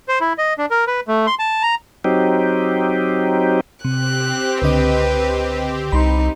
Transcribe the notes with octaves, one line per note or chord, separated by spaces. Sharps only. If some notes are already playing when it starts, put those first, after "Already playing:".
C5
E4
D#5
D4
A#4
B4
A3
C6
A5
A#5
F#3 C4 D#4 G4
C3 C4 G4 F#6
C#2 D3 B4 D#5
C2 D#4 B5 C6